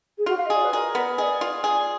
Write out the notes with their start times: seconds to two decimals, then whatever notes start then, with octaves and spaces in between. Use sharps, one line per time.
0.18 G#4
0.26 F4 F#4
0.37 F5
0.45 D#5
0.50 G#4 D5
0.64 B4
0.72 G#4 A#4
0.95 B3
1.18 G#4 D5 D#5
1.41 F4
1.64 G#4